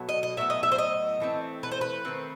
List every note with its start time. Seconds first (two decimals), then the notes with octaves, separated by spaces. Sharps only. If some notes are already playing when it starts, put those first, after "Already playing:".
Already playing: B2 F#3 A3
0.09 D#5
0.23 D#5
0.37 A2 F#3 B3 E5
0.50 D#5
0.63 E5
0.72 C5
0.78 D#5
1.20 E3 A3 C4
1.63 B4
1.71 C5
1.81 B4
2.05 D#3 A3 C4